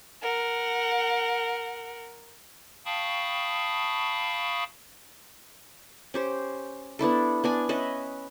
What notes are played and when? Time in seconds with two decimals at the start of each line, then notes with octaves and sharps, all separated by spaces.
0.22 A#4 F#5
2.85 F5 G5 A5 B5 C#6 D#6
6.14 C#4 G4 C5
6.99 B3 D4 E4 A4
7.44 B3 D4 G#5
7.69 C#4 B4 D#5 E5